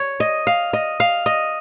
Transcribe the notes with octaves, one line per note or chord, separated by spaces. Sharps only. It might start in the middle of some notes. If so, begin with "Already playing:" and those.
Already playing: C#5
D#5
F5
D#5
F5
D#5